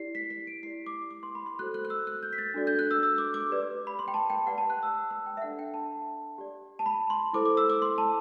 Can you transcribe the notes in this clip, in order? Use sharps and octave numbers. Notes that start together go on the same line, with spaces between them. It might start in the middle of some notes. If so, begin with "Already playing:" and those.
Already playing: E4 G4 D5 C7
B6
B6
D7
E4 G4 D5 C7
D6
D6
C6
B5
C6
F#4 A4 C5 F#6
F#6
F#6
E6
F#6
G6
B6
A6
D4 F#4 A4 D5
G6
F#6
E6
E6
D6
D6
G4 B4 D5
B5
C6
G5
A5
G5
G4 B4 D5 F#5
A5
F#6
E6
E6
E6
G5
E5
D4 A4 D5 F#5
G5
A5
G4 D5
A5
B5
C6
E4 A4 C5 D6
D6
E6
D6
C6
A5